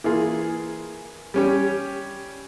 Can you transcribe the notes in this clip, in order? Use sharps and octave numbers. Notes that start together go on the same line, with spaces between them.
E3 A#3 F4 G#4
G3 C#4 G4